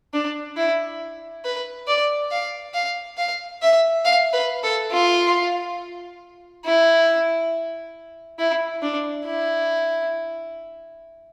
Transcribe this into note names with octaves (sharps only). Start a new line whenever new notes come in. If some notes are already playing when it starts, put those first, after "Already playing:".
D4
E4
B4
D5
F5
F5
F5
E5
F5
B4
A4
F4
E4
E4
D4
E4